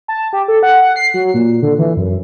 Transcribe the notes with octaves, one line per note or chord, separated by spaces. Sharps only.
A5
G4
A4
F#5
F#5
C7
F#3
A#2
D3
E3
F#2